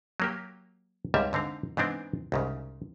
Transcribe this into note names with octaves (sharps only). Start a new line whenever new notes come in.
F#3 A#3 G4
C#2 G#2 G3 E5
G#2 D3 C4 F5
G#2 E3 B3 C4 D4
C2 G#2 C#3